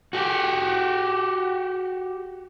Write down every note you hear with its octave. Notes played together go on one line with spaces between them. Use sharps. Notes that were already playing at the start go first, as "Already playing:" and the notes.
F#4 G4